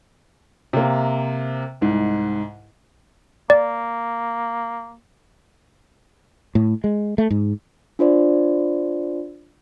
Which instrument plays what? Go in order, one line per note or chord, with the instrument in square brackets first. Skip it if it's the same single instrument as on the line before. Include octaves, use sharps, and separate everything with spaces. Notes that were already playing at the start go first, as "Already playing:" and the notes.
[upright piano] C3 A#3
C2 G#2
[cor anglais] A#3 [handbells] D5
[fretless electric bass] A2
G#3
A3
G#2
[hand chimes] D4 F4 C5 D5